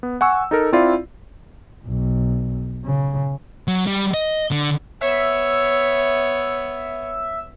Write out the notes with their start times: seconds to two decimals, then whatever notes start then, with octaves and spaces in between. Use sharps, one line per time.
0.03 B3
0.21 F#5 G#5 C#6 E6
0.51 D#4 A4 A#4
0.72 C4 E4 F4 D5
1.87 B1
2.84 C#3
3.68 F#3
3.87 G3
4.14 D#5
4.51 D3
5.01 B3 C#5 E5